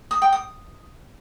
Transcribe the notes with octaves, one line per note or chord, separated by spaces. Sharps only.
D#6
G5
D#6